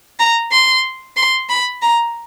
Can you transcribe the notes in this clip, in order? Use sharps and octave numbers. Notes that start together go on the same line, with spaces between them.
A#5
C6
C6
B5
A#5